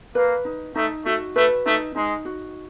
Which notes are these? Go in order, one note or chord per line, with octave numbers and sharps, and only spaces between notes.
A#3 B4
D#4
A3 D#4
A3 F#4
A3 B4
A3 D#4
G#3 D#4
F#4